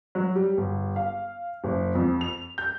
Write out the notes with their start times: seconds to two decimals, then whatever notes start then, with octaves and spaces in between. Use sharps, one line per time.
0.15 F#3
0.35 G3
0.57 G1
0.96 F5
1.64 F#1
1.95 F2
2.21 F7
2.58 G6